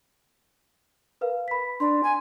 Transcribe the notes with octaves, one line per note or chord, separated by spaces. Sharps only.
A#4 B4 F5
B5 B6
D4 C6
G#5